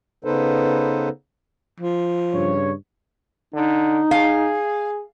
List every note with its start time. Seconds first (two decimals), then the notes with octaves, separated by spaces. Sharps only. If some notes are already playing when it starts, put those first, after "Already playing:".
0.24 C#3 B3 D#4 A4 B4 C5
1.80 F3
2.34 G2 C#3 C#5
3.54 D3 D#4
4.11 G#4 F5